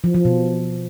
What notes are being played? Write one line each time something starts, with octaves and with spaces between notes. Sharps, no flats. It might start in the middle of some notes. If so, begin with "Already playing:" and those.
F3
F3
B2